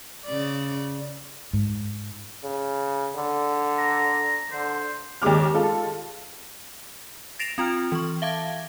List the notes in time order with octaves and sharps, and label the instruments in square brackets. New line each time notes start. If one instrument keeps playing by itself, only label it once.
[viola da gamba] C#3 D5
[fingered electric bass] G#2
[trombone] C#3
D3
[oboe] A#5
[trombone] D3 [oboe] C5
[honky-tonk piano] D#2 D#3 G#3 D6 F6
G#3 F4 A4
[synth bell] A6 A#6 C7 D7 E7 F7
C4 F4 G5 F6
E3 C#6
E5 F5 A5 D6 G#6